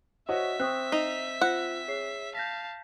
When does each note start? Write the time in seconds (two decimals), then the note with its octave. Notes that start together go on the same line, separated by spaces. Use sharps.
0.29 F#4 C5 C#5 D#5 E5 B6
0.60 C4 C#6 D#6 F#6
0.92 D#4 C7 F7
1.41 F4 C5 F#5 A#6
1.88 G#4 C#5 C7
2.35 F5 A5 G6 A#6 B6